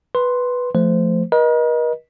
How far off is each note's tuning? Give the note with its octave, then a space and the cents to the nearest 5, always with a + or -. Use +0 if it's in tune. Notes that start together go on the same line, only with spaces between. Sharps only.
B4 +0 C6 +0
F3 +0 A3 +0 C5 -15
A#4 +45 D#5 +0